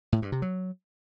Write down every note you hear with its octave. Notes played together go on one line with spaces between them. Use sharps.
A2
G2
C3
F#3